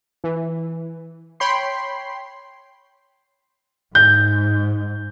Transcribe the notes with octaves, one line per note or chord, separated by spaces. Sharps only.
E3
C#5 G5 B5 C6 C7
G#2 G6